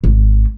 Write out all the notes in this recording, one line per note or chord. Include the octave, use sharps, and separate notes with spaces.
G#1